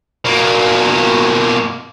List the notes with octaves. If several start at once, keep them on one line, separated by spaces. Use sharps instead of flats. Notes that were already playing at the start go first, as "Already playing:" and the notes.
B2 A#3